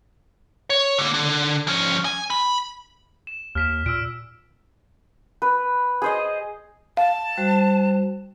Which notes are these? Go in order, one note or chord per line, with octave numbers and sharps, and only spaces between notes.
C#5
D3 A#3
D3
F3 C#4
G#5
B5
E7
D#2 F6 B6 E7
A#2 E6 F6 D7
B4
G#4 C5 D#5
F5 A5
G3 F#4 C5